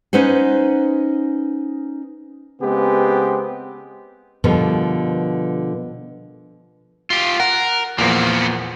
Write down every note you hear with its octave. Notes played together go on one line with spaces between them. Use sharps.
C#4 D#4 B4 C5 F#5
C#3 G#3 B3 C4 G4
B2 D3 F3 G3 A#4 B4
F4 G4
A#4 F#5
E2 A#2 F3 A#3 B3